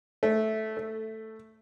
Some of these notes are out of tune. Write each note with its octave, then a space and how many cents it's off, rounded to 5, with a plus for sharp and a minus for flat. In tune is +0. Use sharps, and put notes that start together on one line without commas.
A3 -10
A3 +5